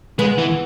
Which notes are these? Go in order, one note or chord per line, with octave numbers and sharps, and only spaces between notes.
G#3 B3
E3